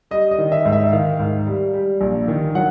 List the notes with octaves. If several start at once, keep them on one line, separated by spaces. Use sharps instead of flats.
G3 D#5
D#5
D#3
E5
G#2
E5
D#3 F5
G#2
G3
G3
A#1
D#3
F#3 F#5